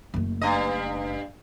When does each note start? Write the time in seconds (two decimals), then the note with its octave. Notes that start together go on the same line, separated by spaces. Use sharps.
0.14 F#1 A3
0.41 G2 D#5